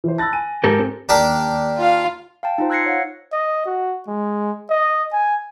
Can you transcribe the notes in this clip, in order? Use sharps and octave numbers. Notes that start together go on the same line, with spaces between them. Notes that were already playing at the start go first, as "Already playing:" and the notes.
E3 C5
A5 B5 E6 F#6 A6 A#6
G#5 D#7
G#2 G4 A4 A#4 A5 G6
C4
D#2 D4 G4 A#4
F4 F5
F5 G5 A5
D#4 F4 C5
E6 F#6 G#6 A#6 C7 C#7
C#5 F5 F#5
D#5
F#4
G#3
D#5
G#5